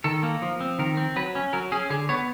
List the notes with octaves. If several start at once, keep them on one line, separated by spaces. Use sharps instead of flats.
D#3 A4
A#3
F3
C4
D#3 A#4
C4
F#3 B4
C#4
F#3 A#4
C#4 G#4
D3 G#4
B3 C#5